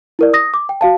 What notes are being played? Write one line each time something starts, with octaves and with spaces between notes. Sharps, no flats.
E4 A#4 D5
D#6 A#6
D6
G5
F#4 F5 A5